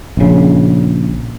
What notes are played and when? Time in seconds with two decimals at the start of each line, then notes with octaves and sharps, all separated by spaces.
0.17 A#1 C#3